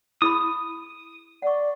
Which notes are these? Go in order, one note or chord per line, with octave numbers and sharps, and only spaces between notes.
E4 G#4 B5 D#6
D5 F#5 C#6